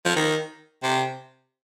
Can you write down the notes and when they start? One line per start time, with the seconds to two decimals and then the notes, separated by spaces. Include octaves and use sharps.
0.05 F3
0.16 D#3
0.83 C3